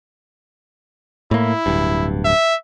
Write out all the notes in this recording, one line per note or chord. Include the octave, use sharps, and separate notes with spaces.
A2 A#3 E4
D1 G2
E5